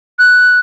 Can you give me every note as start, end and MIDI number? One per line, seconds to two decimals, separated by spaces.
0.19 0.60 90